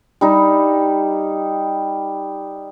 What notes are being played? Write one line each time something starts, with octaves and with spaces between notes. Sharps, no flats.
G3 D#4